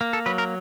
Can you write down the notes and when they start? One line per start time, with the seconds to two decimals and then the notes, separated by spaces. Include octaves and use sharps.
0.01 A#3
0.13 A4
0.26 F#3 B4
0.38 A#4